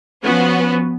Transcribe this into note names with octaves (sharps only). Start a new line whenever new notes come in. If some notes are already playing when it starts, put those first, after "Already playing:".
F3 B3 C#4 F#4